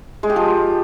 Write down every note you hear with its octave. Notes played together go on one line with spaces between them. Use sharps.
G#3
G4
F3